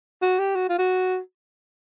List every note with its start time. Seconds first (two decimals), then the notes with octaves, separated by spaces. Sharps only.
0.22 F#4
0.39 G4
0.56 F#4
0.70 F4
0.78 F#4